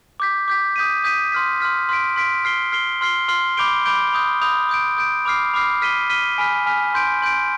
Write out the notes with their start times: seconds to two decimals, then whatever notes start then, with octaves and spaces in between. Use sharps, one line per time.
0.20 D6 G6 B6
0.48 D6 G6 B6
0.76 D#6 G6 B6 D#7
1.04 D#6 G6 B6 D#7
1.32 C6 F6 B6
1.60 C6 F6 B6
1.89 C6 F6 B6 D7
2.16 C6 F6 B6 D7
2.45 F6 C7 G7
2.72 F6 C7 G7
3.01 C6 F6 C7 G7
3.28 C6 F6 C7 G7
3.57 B5 D6 G6 D7 G7
3.85 B5 D6 G6 D7 G7
4.13 B5 D#6 G6
4.42 B5 D#6 G6
4.69 D#6 G6 D7
4.97 D#6 G6 D7
5.25 B5 D6 F6 C7
5.54 B5 D6 F6 C7
5.82 F6 B6 D#7 G7
6.10 F6 B6 D#7 G7
6.38 G#5 B5 F6 B6
6.66 G#5 B5 F6 B6
6.94 C6 G6 D7
7.22 C6 G6 D7